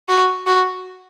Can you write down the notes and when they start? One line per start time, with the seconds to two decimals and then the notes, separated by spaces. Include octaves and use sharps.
0.09 F#4
0.47 F#4